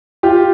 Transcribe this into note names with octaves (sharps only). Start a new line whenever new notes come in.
F4 G4